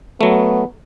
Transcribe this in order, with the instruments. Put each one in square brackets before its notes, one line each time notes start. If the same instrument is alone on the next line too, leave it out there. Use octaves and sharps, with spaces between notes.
[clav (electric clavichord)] F#3 A3 [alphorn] B3